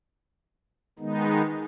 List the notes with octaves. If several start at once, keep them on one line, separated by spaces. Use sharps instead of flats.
D#3 G#3 B3 D#4